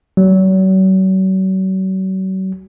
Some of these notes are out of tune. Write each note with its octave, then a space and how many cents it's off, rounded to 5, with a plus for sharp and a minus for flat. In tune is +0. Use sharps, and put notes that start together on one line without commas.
F#3 +40